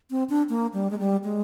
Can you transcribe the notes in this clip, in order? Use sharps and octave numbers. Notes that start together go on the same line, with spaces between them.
C4
D4
A#3
G3
G#3
G3
G#3